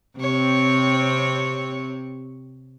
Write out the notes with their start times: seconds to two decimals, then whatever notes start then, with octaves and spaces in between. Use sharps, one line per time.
0.17 C3 C4 C#5